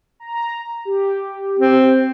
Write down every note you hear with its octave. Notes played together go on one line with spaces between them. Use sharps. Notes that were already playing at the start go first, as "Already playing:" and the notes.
A#5
G4
C4